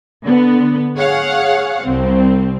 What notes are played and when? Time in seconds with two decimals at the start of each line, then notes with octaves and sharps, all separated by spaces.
0.24 D3 B3
0.97 G#4 C#5 F5 F#5
1.83 C2 C4